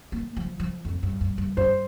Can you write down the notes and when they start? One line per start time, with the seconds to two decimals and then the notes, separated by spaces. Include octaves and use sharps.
0.12 A#3
0.37 F3
0.60 F3
0.85 F2
1.03 G2
1.21 G2
1.38 G2
1.57 G2 C5